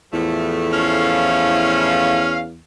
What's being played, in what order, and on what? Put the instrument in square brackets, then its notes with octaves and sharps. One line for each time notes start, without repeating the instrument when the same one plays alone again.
[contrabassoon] E2 [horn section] A2 F3 A3
[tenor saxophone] C#4 [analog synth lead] F5